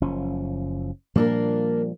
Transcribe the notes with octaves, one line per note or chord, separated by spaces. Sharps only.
F#1 F3 C#4
A#2 F3 G3 A#3 D4 A#4